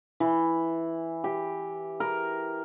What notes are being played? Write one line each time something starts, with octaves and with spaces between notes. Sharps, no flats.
E3
G4
A#4